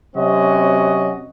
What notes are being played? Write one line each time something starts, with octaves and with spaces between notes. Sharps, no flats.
C3 F#3 C4 C#4 F#4 D#5